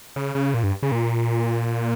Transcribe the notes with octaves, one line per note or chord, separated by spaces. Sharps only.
C#3
C#3
A#2
G2
C#3
A#2